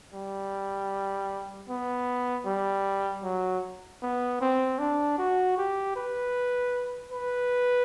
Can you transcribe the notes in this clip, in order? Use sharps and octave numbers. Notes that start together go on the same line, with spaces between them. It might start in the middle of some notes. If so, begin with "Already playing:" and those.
G3
B3
G3
F#3
B3
C4
D4
F#4
G4
B4
B4